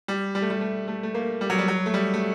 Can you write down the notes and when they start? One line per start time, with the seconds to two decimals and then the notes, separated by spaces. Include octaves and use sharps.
0.08 G3
0.35 G3
0.42 A3
0.50 G3
0.61 A3
0.88 A3
1.03 A3
1.14 A#3
1.41 G3
1.50 F#3
1.58 G3
1.68 F#3
1.86 A3
1.94 G3
2.14 A3